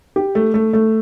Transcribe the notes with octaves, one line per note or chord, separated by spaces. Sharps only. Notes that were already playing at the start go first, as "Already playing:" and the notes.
G4
A3
A3
A3